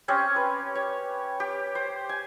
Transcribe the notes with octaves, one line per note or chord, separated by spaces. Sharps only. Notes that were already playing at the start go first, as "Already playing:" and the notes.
C4 C#4 G4 C#5
B4
C#5
G4
C5
G#5